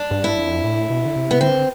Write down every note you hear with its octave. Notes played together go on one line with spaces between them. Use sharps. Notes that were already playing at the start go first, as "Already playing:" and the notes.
Already playing: D4
G2
E4
F2
A2
B2
D3
C3
B3
D3 C4